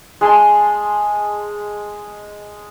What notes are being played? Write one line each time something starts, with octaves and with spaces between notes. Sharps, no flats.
G#3 G#4 A5 C6